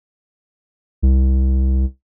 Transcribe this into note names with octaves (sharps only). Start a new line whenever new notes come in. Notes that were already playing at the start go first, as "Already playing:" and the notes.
C2